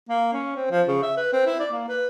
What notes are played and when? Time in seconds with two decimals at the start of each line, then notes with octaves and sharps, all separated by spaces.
0.09 A#3
0.33 C#4
0.56 C4
0.70 F3
0.88 C#3
1.02 E5
1.17 B4
1.33 C4
1.46 E4
1.60 D5
1.72 A#3
1.88 B4